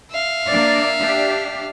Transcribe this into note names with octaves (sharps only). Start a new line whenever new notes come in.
E5 F5
A#3 D4 D5
D4 G4